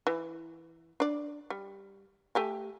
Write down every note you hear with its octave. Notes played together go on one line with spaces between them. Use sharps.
E3
D4 D5
G3
A3 G4 G#5